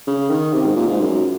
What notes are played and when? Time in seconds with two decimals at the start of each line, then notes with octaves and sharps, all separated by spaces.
0.07 C#3
0.30 D#3
0.53 C3
0.65 G#2
0.77 A#2
0.88 G#2
1.00 F#2